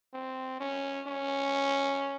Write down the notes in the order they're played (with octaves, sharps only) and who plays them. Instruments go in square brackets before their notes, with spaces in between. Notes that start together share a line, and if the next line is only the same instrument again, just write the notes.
[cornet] C4
C#4
C#4